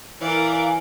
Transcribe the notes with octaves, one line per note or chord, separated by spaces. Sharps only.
E3 A#4 D5 F5 G#5